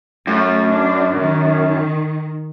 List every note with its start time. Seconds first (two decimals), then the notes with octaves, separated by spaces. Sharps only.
0.27 F#2 A3
0.68 D4
1.16 D#3